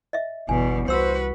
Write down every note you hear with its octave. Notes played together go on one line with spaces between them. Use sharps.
D#5 E5
G1 E2 B2 G#5
C2 F#4 B4 C5 C6 E6